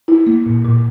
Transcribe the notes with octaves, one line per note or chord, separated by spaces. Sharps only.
E4
A#3
A#2
A#2